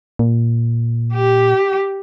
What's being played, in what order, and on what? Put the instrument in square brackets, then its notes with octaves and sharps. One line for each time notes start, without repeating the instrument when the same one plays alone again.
[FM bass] A#2
[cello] G4